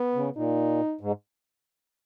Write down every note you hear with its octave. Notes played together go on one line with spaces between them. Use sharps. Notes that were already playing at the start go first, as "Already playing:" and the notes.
Already playing: B3
C#3
A#2 D#4
G#2